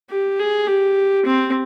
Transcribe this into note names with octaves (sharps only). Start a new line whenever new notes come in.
G4
G#4
G4
C4